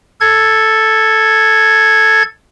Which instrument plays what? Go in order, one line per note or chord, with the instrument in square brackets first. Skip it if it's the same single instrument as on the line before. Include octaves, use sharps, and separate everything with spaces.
[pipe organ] A4 G#6